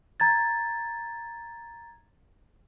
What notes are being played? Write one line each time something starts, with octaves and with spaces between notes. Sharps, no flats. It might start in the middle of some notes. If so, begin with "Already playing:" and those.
A#5 G#6 A6